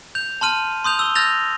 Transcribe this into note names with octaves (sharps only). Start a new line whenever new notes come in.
G6 F7
A5 C6 F6 D#7
C6 D#6 G6 F7
E6 G7
E6 F6 G6 A6 A#6 F7